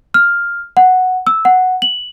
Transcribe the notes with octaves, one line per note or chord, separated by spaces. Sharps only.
F6
F#5
E6
F#5
F#7